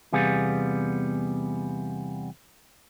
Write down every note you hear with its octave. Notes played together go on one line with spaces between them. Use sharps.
E2 C3 G3 B3 G#4 F5